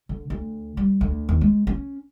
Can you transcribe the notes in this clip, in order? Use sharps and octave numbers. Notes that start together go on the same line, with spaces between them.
D3
D2
G3
D2
D#2
G#3
C#4